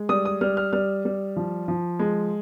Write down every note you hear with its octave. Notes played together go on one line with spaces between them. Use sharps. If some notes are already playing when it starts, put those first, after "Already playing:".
Already playing: G#3
G3 D#6
D#6
G3 F6
F6
G3 F6
G3
F3
F3
G#3